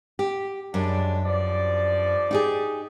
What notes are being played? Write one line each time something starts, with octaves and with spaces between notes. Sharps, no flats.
G4
F#2 G3 G#3 D4
G2 F3 D5
D#4 G4 G#4